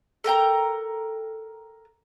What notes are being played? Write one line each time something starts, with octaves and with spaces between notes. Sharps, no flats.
A4 A#4 G5 A#5